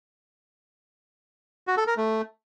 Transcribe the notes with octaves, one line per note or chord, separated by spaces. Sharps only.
F#4
A4
A#4
A3